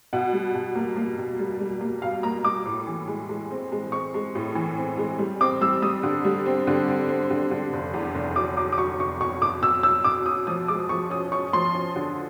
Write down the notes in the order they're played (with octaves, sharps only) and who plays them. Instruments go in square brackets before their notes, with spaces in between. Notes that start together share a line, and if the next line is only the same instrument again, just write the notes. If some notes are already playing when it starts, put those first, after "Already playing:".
[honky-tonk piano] B2 [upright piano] F#5
[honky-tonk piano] G3
B2
A#3
A#3
B2
G3
G3
A#3
[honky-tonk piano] B2 [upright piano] F5
[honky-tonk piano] A#3 [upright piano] A#5
[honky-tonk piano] G3 [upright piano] D6
[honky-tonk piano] A2
E3
G#3
G#3
C4
G#3
[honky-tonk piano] C4 [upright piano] C#6
[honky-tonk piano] G#3
A2
E3
C4
G#3
G3
[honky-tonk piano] C4 [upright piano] D6
[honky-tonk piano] G3 [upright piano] E6
[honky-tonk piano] G3 [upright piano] D#6
[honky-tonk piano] D3
G3
C4
D3
C4
C4
D3
D3
F1
E2
F1
[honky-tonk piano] F#3 [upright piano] D6
[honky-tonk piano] F#3 [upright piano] D6
[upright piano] D6
[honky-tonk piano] F#3 [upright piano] C#6
[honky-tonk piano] F1 [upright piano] C#6
[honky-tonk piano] B2 [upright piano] C#6
[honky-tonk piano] F1 [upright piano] D6
[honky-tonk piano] B2 [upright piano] E6
[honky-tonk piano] F#3 [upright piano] E6
[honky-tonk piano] B2 [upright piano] D6
[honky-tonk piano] C#4 [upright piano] D#6
[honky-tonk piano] F3 [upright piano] D#6
[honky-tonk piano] G#3 [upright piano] D6
[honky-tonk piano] F3 [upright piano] C#6
[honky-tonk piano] C#4 [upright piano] D#6
[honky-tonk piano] C#4 [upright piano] C#6
[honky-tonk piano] F3 [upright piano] C6
[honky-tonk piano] C#4
D3